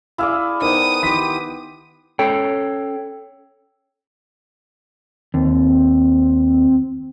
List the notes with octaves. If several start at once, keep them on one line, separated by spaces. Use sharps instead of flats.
E4 G#4 D5 F5 E6 F6
D#3 B3 D#4 C5 D5 D#6
D#3 E4 G4 C6 B6
C#4 A4 C#5 G5
D#2 C4